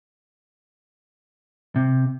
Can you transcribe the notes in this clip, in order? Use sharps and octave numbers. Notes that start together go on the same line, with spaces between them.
C3